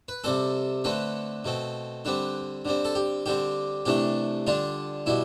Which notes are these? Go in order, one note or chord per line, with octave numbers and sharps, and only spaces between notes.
B4
C3 G3 C4 A4
D3 A3 C4 B4
B2 A3 C4
D3 G3 C4 B4
D3 G3 C4
A4
G4
D3 G3 C4 G4
C3 E3 A3 D4 G4
D3 G3 D4 F4
B2 G3 E4